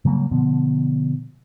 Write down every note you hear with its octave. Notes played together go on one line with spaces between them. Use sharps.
C#3 F#3 G3 A#3
B2 D3 F3 B3